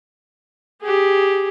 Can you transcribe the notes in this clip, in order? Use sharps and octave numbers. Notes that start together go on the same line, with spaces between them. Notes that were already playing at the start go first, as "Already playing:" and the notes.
G4 G#4